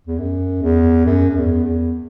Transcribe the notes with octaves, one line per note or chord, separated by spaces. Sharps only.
E2
F#2
E2
F#2
F#2
E2
E2